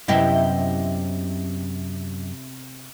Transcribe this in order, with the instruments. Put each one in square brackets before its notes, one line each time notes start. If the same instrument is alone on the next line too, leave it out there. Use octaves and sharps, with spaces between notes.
[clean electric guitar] F#2 D#5 G5 [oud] C3 B3 E4